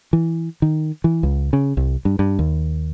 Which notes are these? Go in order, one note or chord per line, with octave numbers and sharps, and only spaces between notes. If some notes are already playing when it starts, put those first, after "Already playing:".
E3
D#3
E3
C#2
C#3
C2
G2
G2
D#2